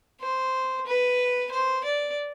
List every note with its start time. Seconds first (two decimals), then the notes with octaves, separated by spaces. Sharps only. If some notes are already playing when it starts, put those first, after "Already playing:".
0.20 C5
0.86 B4
1.51 C5
1.84 D5